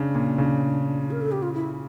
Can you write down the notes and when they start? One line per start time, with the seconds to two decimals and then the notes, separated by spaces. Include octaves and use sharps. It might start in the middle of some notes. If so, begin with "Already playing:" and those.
Already playing: C#3 D4
0.15 A#2
0.38 C#3
1.11 A#4
1.21 A4
1.32 G4
1.42 F4
1.54 E4